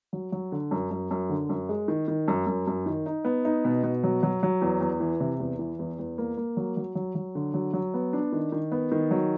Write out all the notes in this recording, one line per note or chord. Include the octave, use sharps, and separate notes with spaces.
F#3
F#3
D3
F#2
F#2
F#2
D3
F#2
G#3
D#3
D#3
F#2
F#2
F#2
D#3
D#4
B3
D#4
B2
B2
F#3
F#3
F#3
E2
E2
E3
C3
E2
E3
E2
E2
A#3
A#3
F#3
F#3
F#3
F#3
D3
F#3
F#3
B3
D4
D#3
D#3
B3
D#3
F#3